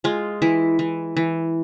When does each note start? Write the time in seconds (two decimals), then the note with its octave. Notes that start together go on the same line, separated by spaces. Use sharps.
0.04 G#3 F4
0.42 E3 E4
0.79 E3
1.17 E3